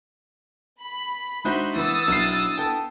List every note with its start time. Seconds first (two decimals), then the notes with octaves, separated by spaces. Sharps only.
0.82 B5
1.45 G#3 D4 D#4 F#4 C5 E5
1.76 E3 B3 D#6 E6 A6
2.07 B1 D4 E4 C7
2.57 B3 A4 G5